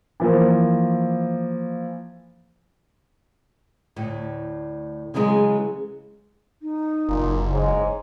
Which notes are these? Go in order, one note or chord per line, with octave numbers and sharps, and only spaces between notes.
E3 F3 A#3
D2 A2
C#3 E3 F#3 G#3 G#4
D#4
F#1 A#2
G#2 C#5